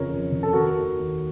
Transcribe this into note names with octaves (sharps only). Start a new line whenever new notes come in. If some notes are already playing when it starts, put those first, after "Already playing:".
Already playing: F2 C#3 F3 A#4 C#5
F2
C#3 F3
A4
D#2 F#4 A#4
D#3
D#2